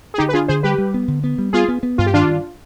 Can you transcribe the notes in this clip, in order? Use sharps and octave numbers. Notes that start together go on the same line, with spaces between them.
G#4
D3 D#4 G4
B4
D4 F4 G#4
D3 G#4 C5
G3 G4 B4
G3
B3
D3
B3
G3
B3 F4 G#4
B3
B3
G2 F4
G4
D#3 D4 F4
G2